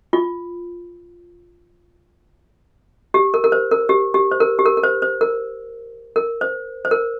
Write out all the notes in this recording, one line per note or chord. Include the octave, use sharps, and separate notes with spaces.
F4
G4
A#4
A#4
C5
A#4
G4
G4
C5
A#4
G4
A#4
A#4
C5
C5
A#4
A#4
C5
C5
A#4